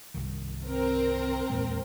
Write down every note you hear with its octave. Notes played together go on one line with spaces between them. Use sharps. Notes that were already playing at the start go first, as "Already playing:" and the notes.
C2 G2 D#3
C4 A#4
E2 A#2 G#3